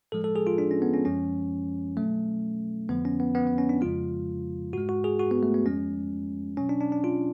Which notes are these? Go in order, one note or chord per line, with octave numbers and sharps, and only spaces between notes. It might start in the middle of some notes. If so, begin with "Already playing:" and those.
A2 F3 G#3 A4
A4
G#4
F4
D4
C#4
B3
C#4
F#2 F3 G#3 C#4
B2 F#3 A3
F2 D3 F3 B3
C#4
B3
B3
B3
C#4
D4
F2 C#3 F3 G#3 F4
G#2 G#3 F#4
F#4
G#4
F#4
B3
A3
B3
F2 F3 G#3 C#4
B2 F#3 C#4
D4
D4
D4
F4